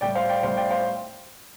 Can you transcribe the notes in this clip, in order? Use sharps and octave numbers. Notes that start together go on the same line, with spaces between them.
A2 G3 D5 G5
C5 F5
D5 G5
A2 G3 C5 F5
D5 G5
C5 F5